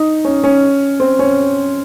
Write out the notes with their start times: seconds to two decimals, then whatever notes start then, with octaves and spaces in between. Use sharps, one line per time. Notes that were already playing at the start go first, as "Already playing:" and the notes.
Already playing: D#4
0.25 C#4
0.44 C#4
1.00 C4
1.19 C#4